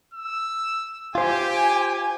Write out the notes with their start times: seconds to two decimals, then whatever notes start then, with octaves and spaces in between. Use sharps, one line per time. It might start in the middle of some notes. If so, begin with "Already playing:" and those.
0.14 E6
1.15 F4 G4 C5 G#5